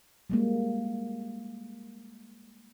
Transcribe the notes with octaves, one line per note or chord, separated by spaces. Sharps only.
G3 G#3 A#3